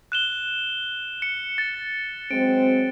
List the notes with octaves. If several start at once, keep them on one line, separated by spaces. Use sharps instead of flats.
F#6 E7 G7
C#7
A6
F#3 G#3 C4 D7